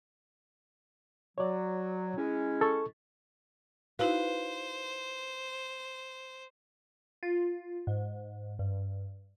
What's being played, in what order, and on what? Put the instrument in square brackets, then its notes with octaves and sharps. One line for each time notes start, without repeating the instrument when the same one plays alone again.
[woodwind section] F#3 [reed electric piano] C#5 D5
[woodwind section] G#3 C#4 E4
[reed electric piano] A4 C#6
[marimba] D#4 E4 F#4 [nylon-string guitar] B4 F5 [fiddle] C5
[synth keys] F4
G#2
G2